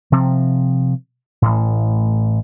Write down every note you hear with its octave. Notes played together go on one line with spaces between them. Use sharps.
C3 F3 C4
A1 A2